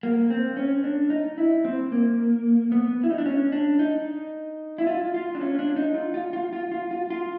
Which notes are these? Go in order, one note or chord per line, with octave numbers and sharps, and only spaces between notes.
A#3
C4
C#4
D4
D#4
E4
C4
A#3
B3
E4
D#4
D4
C#4
D4
D#4
E4
F4
F4
D4
C#4
D4
D#4
F4
F4
F4
F4
F4
F4
F4